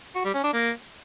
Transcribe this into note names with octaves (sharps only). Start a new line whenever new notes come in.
F#4
G3
C#4
D4
A#3